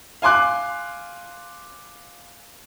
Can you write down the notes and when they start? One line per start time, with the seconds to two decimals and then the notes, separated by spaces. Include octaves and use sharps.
0.22 F5 G#5 C6 D6 F#6